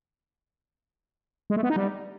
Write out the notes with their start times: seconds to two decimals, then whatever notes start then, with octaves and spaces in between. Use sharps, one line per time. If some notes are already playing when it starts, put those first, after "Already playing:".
1.50 G#3
1.56 A3
1.63 B3
1.70 D#4
1.76 G3